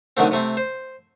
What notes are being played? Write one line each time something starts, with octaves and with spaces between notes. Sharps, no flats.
D3 D#3 F#3 A3 C4
C3 A3 C4
C5